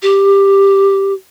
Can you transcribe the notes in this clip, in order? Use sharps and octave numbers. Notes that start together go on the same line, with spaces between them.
G4